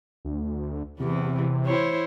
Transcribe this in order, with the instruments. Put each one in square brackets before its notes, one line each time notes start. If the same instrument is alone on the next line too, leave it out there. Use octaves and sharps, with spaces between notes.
[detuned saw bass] D2
[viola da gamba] E2 E3 [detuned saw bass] C3
[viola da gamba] E4 C5 C#5